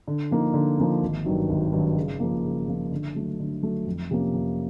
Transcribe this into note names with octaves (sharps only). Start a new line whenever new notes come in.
D3
F3 A#3 D#4
D3
F3 A#3 D#4
G#1
G2 D#3 F#3
G#1
G2 D#3 F#3
C#3
F3 A#3
C#3
F3 A#3
D3
F#3 A3
D3
F#3 A3
F2
C3 F3 A#3 C#4
F2